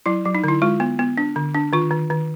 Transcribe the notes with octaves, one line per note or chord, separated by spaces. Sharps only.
F#3 E4
F#3
D#4
D3 E4
G#3 F4
B3
B3
D4
D3
D4
D#3 F4
D#3
D#3